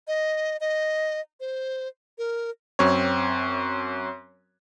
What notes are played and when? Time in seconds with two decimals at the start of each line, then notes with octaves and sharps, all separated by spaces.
0.08 D#5
0.61 D#5
1.40 C5
2.18 A#4
2.79 F#2 C4 C#5